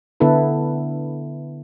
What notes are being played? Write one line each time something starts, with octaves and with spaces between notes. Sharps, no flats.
D3 B3 E4 A4 B4